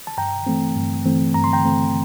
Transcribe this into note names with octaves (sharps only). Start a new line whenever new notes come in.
A5
G2 G5 A#5
E3 A3 C4
G2
E3 A3 C4
G2 A#5
C6
G5 A#5
E3 A3 C4